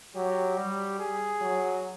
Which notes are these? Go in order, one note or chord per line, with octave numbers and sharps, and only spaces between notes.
F#3 G4
G3
G#4
F#3